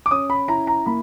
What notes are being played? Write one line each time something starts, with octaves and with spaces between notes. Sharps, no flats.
D6
C#4 D#6
B5
E4 A#5
A#5
A#3 B5